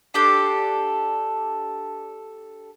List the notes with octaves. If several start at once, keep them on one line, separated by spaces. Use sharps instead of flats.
D4 G4 A4